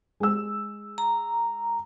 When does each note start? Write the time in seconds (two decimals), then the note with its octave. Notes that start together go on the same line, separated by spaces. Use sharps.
0.20 G#3 E6
0.98 A#5